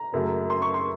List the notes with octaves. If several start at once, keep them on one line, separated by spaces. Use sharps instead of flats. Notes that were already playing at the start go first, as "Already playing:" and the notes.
Already playing: A#5
F#1 F#2 C#3 F#3 A3
C6
C#6
C6